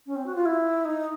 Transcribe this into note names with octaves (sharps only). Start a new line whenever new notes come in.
C#4
C4
F#4
F4
E4
D#4